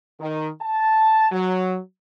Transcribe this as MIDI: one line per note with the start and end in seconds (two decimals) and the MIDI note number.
0.20 0.48 51
0.62 1.28 81
1.32 1.77 54